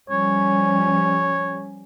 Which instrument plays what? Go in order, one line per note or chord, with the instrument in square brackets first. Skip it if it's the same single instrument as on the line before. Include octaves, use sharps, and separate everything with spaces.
[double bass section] F3 G3 C#4 [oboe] C#5